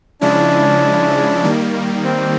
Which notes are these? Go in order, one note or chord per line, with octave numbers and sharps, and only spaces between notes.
C#3 F3 G#3 C#4 D4 E4
D#3 G3 A#3
C4